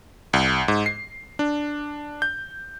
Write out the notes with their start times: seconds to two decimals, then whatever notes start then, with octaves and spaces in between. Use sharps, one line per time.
0.33 C2
0.68 G#2
0.86 C7
1.39 D4
2.22 G6